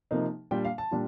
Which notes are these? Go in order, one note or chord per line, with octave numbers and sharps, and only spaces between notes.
C3 F3 A#3 D#4
A#2 G3 D4 F4 G5
F5
A5
A#2 G3 D4 F4